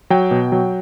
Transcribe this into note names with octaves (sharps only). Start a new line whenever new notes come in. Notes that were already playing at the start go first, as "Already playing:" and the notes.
F#3 G5
B2
F#3